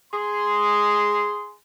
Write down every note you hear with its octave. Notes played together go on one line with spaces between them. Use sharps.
G#4 C6